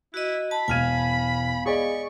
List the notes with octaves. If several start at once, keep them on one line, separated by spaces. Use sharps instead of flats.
E4 F#4 D#5
A5 B5
E1 B3 F5 G#5 F6 G#6
G#4 D5 D#5 C#6